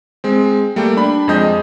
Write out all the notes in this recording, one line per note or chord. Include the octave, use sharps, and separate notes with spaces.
G#3 C4
G3 A3 A#3 G5
D4 B5
F2 G#3 D#5 G6